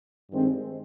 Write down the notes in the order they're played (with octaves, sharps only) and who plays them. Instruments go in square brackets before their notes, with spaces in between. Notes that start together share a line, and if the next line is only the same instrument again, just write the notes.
[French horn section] G2 D#3 G#3 C4